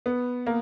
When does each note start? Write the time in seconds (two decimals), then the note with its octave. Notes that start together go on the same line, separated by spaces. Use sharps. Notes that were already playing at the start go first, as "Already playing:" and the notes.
0.06 B3
0.46 A#3